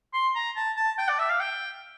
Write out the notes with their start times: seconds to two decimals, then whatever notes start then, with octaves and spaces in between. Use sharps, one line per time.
0.13 C6
0.35 A#5
0.56 A5
0.76 A5
0.98 G5
1.09 D5
1.19 E5
1.29 F5
1.40 G5